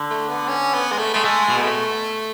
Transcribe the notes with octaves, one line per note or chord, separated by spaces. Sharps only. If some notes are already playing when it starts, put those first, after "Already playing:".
Already playing: D3
A3
B3
C#4
B3
G#3
A3
G#3 A3
G#3 A3
B2
B3
A3